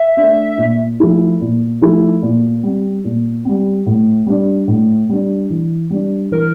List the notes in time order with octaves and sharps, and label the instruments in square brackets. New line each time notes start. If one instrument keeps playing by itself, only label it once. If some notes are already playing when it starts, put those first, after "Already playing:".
Already playing: [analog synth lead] E5
[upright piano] A3 D4
A#2
F3 A3 E4
A#2
F3 A3 E4
A#2
G3 C4
A#2
G3 C4
A2
G3 D4
A2
G3 D4
E3
G3 D4
[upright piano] E3 [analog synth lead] A#4